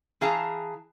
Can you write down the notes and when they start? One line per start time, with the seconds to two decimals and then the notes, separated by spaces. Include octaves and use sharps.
0.21 E3 G#4 F5 G5 A5 A#5